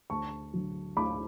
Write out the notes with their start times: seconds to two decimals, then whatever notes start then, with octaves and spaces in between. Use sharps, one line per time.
0.10 D2 A5 C#6
0.54 D3 F#3
0.97 D2 B5 D6